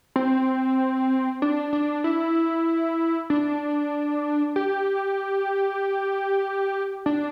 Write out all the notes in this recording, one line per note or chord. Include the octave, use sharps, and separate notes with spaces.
C4
D4
D4
E4
D4
G4
D4